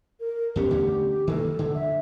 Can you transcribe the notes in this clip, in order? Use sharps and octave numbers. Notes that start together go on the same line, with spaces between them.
A#4
E2 B3 C#4 G4
D3 A3 C#4
D#3 E3 A#3 A4
D3
E5